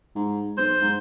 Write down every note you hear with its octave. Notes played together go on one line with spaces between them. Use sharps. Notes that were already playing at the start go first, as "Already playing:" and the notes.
G#2
B1 C5
G#2